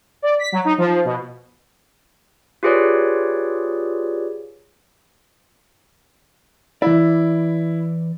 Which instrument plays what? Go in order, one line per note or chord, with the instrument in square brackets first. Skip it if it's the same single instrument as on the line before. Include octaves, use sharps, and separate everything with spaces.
[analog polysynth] D5
B6
F#3
D#4
F3
B2
[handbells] F4 G4 G#4 B4 C#5 D5
[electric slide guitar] E3 D5 [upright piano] E4